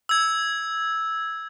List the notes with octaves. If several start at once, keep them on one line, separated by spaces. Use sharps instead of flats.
E6 G#6